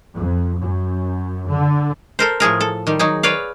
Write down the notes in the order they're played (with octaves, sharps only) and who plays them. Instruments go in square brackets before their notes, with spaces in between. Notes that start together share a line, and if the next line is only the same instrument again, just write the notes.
[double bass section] F2
F#2
D3
[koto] A4 A#4 C5
A2 F3 G#4 A#4
A4
D#3 G3
F#3 D#4 G#4
B4 C#5 D5 F5